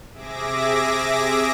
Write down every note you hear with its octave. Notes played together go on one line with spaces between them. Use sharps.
C3 G#4 E5 D6 A#6